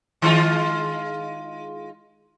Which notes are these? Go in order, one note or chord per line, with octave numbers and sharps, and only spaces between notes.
D#3 G#3 F4